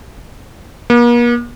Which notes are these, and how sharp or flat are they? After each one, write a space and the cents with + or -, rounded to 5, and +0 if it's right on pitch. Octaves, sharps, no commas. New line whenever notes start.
A#3 +45